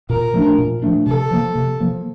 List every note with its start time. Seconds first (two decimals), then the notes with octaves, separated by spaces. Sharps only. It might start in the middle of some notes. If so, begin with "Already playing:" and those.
0.10 A#2 A#4
0.34 F3 A3 D4
0.58 A#2
0.82 F3 A3 D4
1.06 C3 A4
1.31 F3 A#3
1.55 C3
1.80 F3 A#3